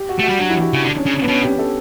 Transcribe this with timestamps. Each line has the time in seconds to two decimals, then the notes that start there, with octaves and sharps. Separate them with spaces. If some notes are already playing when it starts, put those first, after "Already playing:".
Already playing: G4
0.09 F#4
0.19 A3
0.24 F#4
0.29 G3
0.39 F#3 D4
0.50 E4
0.57 G4
0.61 F#4
0.73 C#3
0.83 D3 D4
0.98 C#4
1.06 C#3
1.22 B3
1.28 B2 C#4
1.43 G4
1.59 A4